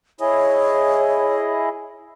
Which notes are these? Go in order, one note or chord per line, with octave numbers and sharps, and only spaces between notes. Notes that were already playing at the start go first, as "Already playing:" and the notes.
E4 G#4 C#5 D#5